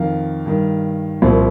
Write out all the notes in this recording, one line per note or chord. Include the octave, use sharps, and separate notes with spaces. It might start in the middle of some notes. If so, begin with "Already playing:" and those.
Already playing: F2 D#3 F5
G2 D#3
C2 A#2 F3